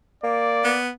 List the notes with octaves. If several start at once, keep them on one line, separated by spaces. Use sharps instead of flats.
A#3 D5
B3